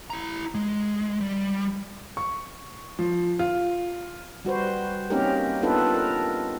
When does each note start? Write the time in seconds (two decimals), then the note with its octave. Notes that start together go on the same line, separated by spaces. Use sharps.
0.10 E4 A#5
0.55 G#3
1.21 G3
2.17 C#6
2.99 F3
3.39 F4
4.45 G3 F#4 B4 C5
5.10 A#3 C4 C#4 D#4 G4 A#4
5.62 B3 D4 D#4 F4 A4 B4
5.94 A#4